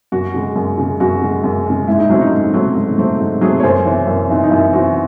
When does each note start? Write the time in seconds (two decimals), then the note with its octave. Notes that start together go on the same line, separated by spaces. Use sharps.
0.12 F#2 F#4
0.34 C#3 G#3
0.56 F#2
0.78 C#3 G#3
1.00 F#2 F#4
1.22 C#3 G#3
1.44 F#2
1.66 C#3 G#3
1.88 G#2 E4
1.99 D#4
2.10 F#3 A3 C4 C#4
2.21 D#4
2.32 G#2
2.54 F#3 A3 C4
2.76 G#2
2.98 F#3 A3 C4
3.20 G#2
3.41 F#3 A3 C4 G#4
3.60 C#5
3.63 F#2 C5
3.85 E3 C4 C#5
4.07 F#2
4.30 E3 C4 D#4
4.43 D#4
4.51 F#2 E4
4.73 E3 C4 F#4